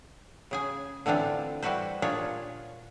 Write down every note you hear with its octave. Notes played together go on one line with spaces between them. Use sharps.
C#3 G#4 G#5
D3 E3 C4 D4 F4
G3 E4 F#4 B4 C5
A#2 D4 F4 G#4 C#5